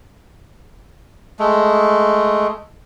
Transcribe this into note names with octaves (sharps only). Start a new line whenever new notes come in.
G#3 A3